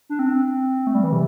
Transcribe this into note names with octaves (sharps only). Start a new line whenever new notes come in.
D4
C4
A3
G3
E3
C3